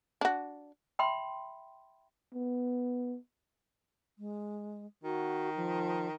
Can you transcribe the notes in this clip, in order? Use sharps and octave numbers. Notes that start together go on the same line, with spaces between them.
D4 F#4
E5 G5 B5 C6
B3
G#3
D#3 F#4
F3